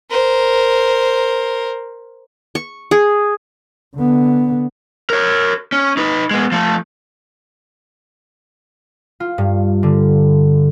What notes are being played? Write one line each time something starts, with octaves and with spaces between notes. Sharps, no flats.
A#4 C5
C#6
G#4
D3 B3
A#4 C#5
C#4
D#4 B4
G#3 B3
F3 A3
F4
G2
D3